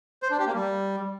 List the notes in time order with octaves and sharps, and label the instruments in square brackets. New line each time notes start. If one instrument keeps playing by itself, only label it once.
[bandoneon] C5
D4
G4
A#3
G3